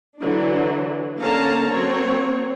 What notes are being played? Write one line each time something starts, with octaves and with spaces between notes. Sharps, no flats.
D3 E3 F#3 D4
D3 A#3 C#4 F5 A5 A#5
F#3 A#3 C4 C#5